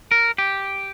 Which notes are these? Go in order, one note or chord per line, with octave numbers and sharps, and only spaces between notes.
A#4
G4